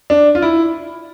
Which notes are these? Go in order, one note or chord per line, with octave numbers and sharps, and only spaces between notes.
D4
F4
E4